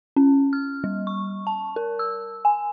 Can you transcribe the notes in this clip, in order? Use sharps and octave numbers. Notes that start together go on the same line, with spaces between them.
C#4
F6
G3
C#6
A5
A#4
E6
G#5